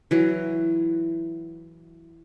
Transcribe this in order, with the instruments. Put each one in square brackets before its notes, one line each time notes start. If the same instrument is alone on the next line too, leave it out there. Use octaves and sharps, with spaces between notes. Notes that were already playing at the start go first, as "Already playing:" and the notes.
[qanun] E3 F#3